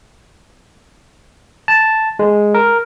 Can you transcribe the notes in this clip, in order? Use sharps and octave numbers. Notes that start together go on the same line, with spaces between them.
A5
G#3
A#4